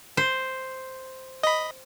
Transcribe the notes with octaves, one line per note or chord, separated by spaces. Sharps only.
C5
D#5 B5